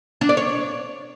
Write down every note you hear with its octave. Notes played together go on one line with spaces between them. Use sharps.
D4
D5
C#5